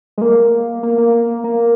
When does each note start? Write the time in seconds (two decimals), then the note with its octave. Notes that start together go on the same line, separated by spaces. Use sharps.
0.18 G#3
0.22 A#3
0.83 A#3
0.98 A#3
1.44 A#3